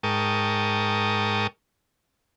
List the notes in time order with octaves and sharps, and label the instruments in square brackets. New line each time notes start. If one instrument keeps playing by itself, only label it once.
[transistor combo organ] G#2 A#4 G5 A5 C#6 D#6